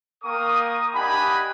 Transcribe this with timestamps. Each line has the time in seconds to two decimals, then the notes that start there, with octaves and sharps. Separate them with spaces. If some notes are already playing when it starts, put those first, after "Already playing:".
0.23 A#3 A#4 G5 C#6 D#6
0.94 D4 G4 D#5 F#5 G#5 B5